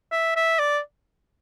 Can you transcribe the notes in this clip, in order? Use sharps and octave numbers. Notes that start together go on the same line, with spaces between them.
E5
E5
D5